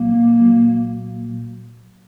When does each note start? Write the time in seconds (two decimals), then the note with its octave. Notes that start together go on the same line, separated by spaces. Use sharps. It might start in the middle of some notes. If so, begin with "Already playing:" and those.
Already playing: C2 A#2 F#3 A#3
0.39 C2 A#2 F#3